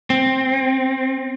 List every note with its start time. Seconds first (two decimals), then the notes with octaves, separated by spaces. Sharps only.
0.10 C4